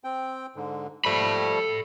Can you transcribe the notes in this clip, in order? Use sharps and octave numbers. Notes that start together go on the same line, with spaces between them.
C4 G5
G#2 D3
F3 G3 A3 A4 B5